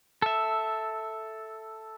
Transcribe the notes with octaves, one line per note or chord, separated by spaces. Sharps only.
A4 E5